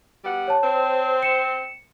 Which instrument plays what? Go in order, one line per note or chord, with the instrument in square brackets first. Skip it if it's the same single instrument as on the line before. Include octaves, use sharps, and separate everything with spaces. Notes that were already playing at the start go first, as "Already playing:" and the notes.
[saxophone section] G3 B3 F#5
[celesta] C#5 A5
[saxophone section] C4 C5
[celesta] C#7 E7